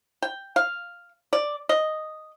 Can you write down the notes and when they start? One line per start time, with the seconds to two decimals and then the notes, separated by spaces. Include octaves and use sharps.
0.22 G5
0.56 F5
1.33 D5
1.69 D#5